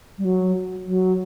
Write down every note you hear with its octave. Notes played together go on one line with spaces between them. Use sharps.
G3
F#3
F#3